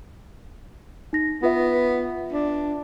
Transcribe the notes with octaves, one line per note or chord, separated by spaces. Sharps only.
D#4 A#6
B3 F4 B4 E5
D4